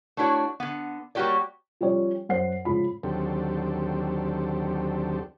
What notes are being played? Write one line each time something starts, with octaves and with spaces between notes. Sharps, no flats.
A3 D4 E4 F#4 C#5
D3 B3
G3 A#3 F#4 G4 C#5 D5
F3 G3 C#4 C#5 D5
F#2 C5 F#5 C7
G#2 C#3 F3 B5
D#2 D3 F#3 C4 G4 A4